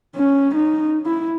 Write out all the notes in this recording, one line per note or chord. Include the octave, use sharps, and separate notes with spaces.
C#4
D#4
E4